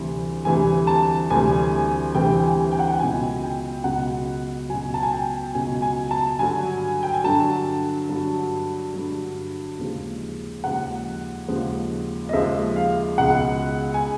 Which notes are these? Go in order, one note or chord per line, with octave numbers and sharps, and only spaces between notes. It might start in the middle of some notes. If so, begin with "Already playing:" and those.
Already playing: D2 C3 E3 G3
D2 C3 E3 G3 G#5
A5
D2 C3 E3 G3 G#5
D2 C3 E3 G3 G5
G#5
G5
F#5
G5
C#2 B2 F#3 G#5
G5
C#2 B2 F#3 F#5
C#2 B2 F#3 G#5
A5
G#5
G5
C#2 B2 F#3 G#5
G#5
A5
G2 D3 F#3 G#5
G5
G#5
G2 D3 F#3 A5
G2 D3 F#3
G2 D3 F#3
D#2 C#3 F3 G#3
D#2 C#3 F3 G#3 F#5
D#2 C#3 F3 G#3
D#5
D#2 C#3 F3 G#3 E5
F5
C#2 B2 G#3 F#5
G#5